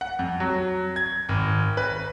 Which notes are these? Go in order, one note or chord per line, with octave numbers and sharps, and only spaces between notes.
F#5
F2
F#3
G#6
G#1
B4